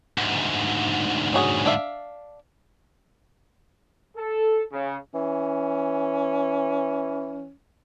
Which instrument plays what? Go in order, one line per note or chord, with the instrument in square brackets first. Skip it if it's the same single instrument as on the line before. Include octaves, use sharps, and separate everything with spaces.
[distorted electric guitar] D2 G#2
[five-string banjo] C#4 F#4 G#4
D4 E5 F5
[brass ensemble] A4
C#3
[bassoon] E3 [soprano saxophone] C#4